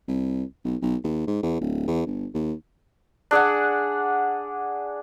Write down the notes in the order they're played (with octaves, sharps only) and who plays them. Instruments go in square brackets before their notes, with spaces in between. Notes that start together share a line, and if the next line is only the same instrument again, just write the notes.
[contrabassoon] C2
B1
B1
D#2
G#2
E2
D1
E2
G1
D#2
[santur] D4 G#4 D5 F#5